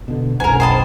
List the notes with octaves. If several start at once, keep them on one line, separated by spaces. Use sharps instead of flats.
B2 D3
E1 B1 F#2 A#4 C5 F#5 G#5 A#5
C5 D#5 G5 A5 B5